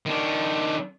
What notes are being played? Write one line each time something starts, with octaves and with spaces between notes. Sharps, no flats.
D#3 D4